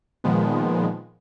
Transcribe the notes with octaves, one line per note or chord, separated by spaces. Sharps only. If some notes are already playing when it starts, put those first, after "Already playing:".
A#2 D#3 F3 G#3 B3